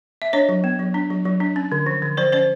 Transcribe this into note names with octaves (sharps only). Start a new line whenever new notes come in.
E5
D4 C#5 D#5
F#3
B3
F#3
D4
F#3
F#3
D4
C#4
D3
F3
D3
F3 C5 D5
C#4 C5 D5